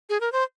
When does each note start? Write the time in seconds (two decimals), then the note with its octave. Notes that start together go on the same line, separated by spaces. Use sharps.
0.09 G#4
0.20 A#4
0.32 C5